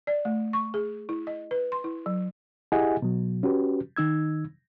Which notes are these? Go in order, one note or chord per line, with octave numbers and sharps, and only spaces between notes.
D5
A3
C#6
G#4
E4
D#5
B4
C6
E4
F#3
E4 G4 G#4 D#5 F#5 G#5
B2 F#3
C#4 F#4 G4 B4
D#3 D#4 E6 G#6